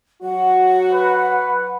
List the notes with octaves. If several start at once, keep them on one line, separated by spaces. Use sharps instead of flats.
F#3 F#4 F#5
B4